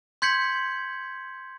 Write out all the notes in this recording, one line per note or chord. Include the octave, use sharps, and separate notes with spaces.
C6 G6 G#6 B6 C#7 F#7